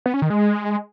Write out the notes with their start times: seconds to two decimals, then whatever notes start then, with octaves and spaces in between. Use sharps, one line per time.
0.06 B3
0.14 C#4
0.22 D#3
0.30 G#3